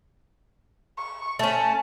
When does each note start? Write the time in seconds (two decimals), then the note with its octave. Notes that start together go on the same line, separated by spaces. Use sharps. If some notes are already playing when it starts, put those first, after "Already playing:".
0.97 C#6
1.39 A3 C#4 A5